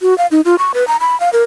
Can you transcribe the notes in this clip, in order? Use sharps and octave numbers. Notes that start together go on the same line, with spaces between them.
F#4
F5
D#4
F4
C#6
B4
A#5
B5
F5
A#4